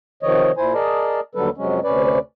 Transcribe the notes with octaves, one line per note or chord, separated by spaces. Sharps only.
C3 D#3 F3 C#5 D#5
A#2 E4 C5 G#5
G#4 A#4 D5 D#5 A5
D#2 D3 F#3 G3 A4 B4
F2 C3 F#3 G#3 C#4
D2 C3 C#4 B4 D5